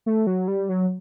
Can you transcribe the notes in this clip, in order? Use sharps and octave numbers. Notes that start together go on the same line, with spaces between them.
A3
F#3
G3
F#3